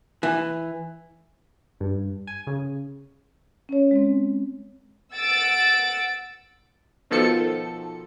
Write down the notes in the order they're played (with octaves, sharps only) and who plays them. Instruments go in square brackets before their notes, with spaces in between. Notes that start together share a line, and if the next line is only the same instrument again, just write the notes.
[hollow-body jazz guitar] E3
[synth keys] G2
G#5
C#3
[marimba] C#4 C#5
G#3 C4
[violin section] F#5 E6 A6 D7
[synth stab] B2 D#3 F3 A4 C#7